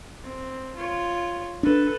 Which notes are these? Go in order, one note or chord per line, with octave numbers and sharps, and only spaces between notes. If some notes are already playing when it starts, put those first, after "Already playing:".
C4
F4 C#5
D4 A4 B4